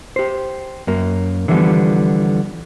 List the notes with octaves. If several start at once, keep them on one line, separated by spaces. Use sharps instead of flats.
G4 C5
F#2 A#3
D3 E3 F3 G3 B3